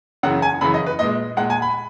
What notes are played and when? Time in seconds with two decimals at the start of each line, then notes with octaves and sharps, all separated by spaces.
0.23 F#2 C#3 E3 F#5
0.42 G#5
0.61 F#2 C#3 E3 B5
0.74 D#5
0.86 B4
0.99 A#2 G#3 D#5
1.37 A#2 G#3 F#5
1.50 G#5
1.62 B5